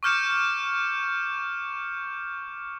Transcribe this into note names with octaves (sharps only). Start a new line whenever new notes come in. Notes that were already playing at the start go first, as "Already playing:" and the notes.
C#6 D6 F6 G6 C#7 E7